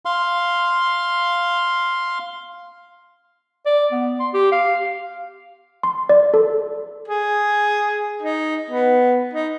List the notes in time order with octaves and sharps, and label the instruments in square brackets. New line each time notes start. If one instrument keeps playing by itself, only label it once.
[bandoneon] F5 C6
[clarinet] D5
B3
C6
G4
F5
[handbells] C6
D5
A4
[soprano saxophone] G#4
D#4
B3
D#4